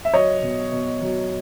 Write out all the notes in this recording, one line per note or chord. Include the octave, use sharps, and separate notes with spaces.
E5
F#3 C#5 D#5
B2
B2
F#3